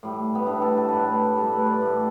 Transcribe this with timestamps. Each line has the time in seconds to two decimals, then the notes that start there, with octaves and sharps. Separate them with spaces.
0.03 A2 G3
0.35 B3
0.47 A2 G3 D4
0.62 A4
0.77 A4
0.89 A2 G3 B4
1.00 A4
1.37 A2 G3 A4
1.53 B4
1.67 D5
1.82 A2 G3